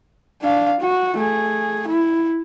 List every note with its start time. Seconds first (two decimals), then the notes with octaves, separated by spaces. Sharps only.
0.42 D4 F5
0.81 F#4
1.18 A3 G#4
1.88 E4